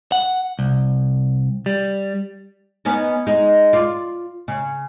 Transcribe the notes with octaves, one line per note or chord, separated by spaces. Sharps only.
F#5
C2
G3
B3 C#4 D#4
G#3 D#4
F4 D5
C#3